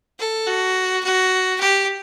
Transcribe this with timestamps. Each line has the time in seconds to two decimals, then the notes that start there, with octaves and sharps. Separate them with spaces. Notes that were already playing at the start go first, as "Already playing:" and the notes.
0.19 A4
0.47 F#4
1.04 F#4
1.60 G4